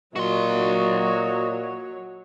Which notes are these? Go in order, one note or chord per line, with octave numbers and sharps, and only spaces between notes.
A#2 F#3 F#4 C#5 D#5 C6